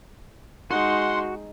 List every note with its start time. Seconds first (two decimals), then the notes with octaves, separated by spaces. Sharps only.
0.71 G#3 D#4 F#4 F#5 C6